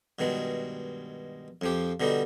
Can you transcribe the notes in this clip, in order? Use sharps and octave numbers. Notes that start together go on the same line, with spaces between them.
G2 B2 D#3 G#3
F2 F3 G4
B2 D3 G3 D#4